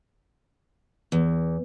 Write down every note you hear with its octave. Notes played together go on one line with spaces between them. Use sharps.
E2